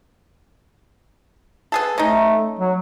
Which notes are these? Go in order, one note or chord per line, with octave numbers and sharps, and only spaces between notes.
B3 G#4 A4
A3 C#4 D#4
F#3